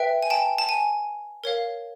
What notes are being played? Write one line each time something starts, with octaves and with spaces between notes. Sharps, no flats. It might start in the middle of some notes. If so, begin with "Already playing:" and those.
Already playing: B4 E5 G5
G#5
G5 A5
A5
G#5
A#4 C#5 F5